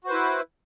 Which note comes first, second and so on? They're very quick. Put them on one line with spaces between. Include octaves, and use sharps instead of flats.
F#4 C5 B4 E4